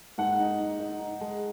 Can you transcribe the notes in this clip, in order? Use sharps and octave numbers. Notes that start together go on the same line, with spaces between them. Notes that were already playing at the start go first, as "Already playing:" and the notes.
G#2 F#5
D#4
G#2
D#4
D#4
G#3